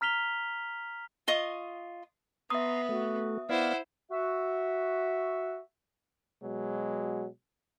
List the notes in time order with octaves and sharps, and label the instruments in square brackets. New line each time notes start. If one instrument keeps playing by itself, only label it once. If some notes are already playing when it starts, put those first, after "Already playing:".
[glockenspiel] A#5 F6 B6 F7 G7
[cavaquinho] F4 D#5 C#6 D#6
[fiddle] B3 [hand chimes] E5 D#6 [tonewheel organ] A#5 C6
[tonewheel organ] A3 [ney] F#4
[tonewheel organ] B3 D5 F5 [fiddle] E4 C5 [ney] F#5
[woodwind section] F#4 E5
[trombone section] B2 F#3 G#3